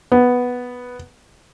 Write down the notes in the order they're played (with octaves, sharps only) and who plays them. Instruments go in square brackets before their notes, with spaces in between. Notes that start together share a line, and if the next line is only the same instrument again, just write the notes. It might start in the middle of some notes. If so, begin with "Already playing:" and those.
[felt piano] B3